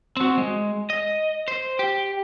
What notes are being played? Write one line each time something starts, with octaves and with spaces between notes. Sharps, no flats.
C4 F#4
G#3
D#5
C5
G4